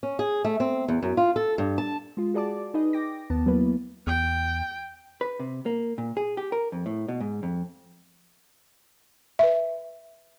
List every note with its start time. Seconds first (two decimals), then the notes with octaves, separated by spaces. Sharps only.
0.03 C#4
0.19 G#4
0.45 A3
0.60 C4
0.88 E2
1.03 F#2
1.17 F4
1.36 A4
1.58 G2
1.78 A5
2.17 G#3 F4
2.34 F#4 G#4 D5 A5 D6
2.74 D#4 G#4 B4 D#5
2.93 G5 D6 A#6
3.30 D#2 B3 A5
3.46 F#3 A#3 B3 E4 B4
4.07 E2 G5
5.21 B4
5.40 C3
5.66 A#3
5.98 A#2
6.17 G#4
6.37 G4
6.52 A#4
6.72 F2
6.86 A2
7.08 B2
7.21 G#2
7.43 F2
9.39 B4 E5